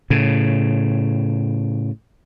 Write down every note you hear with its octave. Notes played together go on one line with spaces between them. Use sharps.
A2 C#3